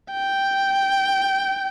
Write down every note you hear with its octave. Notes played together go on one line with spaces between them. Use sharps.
G5